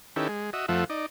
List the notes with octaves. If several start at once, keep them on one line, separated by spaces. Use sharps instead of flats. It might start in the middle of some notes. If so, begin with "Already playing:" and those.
D#3 C#4 E4 G4 A4 B4
G#3
F#4 D#5 E5
F2 F3 A3 E5 F#5
D#4 D5